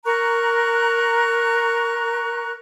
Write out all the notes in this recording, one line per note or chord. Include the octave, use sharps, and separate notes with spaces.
A#4 A#5 C#6 F#6